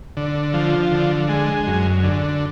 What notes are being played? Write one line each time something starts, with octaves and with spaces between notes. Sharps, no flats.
D3
F3
D3
G#3
F#2
D3